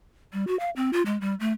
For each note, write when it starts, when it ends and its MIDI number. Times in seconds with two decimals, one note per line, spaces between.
0.33 0.45 55
0.47 0.58 66
0.60 0.70 77
0.76 0.90 60
0.93 1.02 65
1.06 1.19 56
1.21 1.35 55
1.40 1.52 57